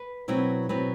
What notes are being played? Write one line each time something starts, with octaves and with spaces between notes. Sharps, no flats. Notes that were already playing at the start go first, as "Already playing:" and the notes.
Already playing: B4
B2 F#3 C4 E4 B4
B2 F#3 C4 E4 B4